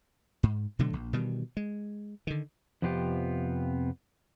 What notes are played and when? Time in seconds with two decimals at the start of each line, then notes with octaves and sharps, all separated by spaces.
0.43 G#2
0.79 B2 D3 F#3 A3
0.93 A#1
1.13 B2 D#3 E3 G3
1.57 G#3
2.27 D3 D#3
2.82 F2 C3 F3 B3 F4 G4